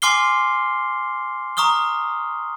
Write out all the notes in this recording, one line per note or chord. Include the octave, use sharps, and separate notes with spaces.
G#5 C6 D6 F6 C7 G7
A#5 C#6 D#6 F6 G7